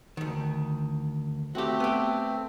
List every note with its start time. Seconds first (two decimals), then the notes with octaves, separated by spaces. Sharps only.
0.17 D2 D#3
1.55 A3 C4 F#4 G4
1.80 B3 G4